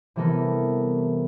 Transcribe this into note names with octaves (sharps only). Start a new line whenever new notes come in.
C3 E3 G3 B3 A4 A#4